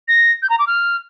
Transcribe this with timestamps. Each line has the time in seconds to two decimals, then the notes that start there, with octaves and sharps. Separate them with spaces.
0.08 A#6
0.42 G6
0.50 A#5
0.59 D6
0.67 F6